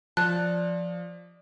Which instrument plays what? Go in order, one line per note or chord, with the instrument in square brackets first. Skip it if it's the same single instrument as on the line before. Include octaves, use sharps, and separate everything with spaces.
[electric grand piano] F3 [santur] D5 D#5 [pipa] A5 [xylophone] F#6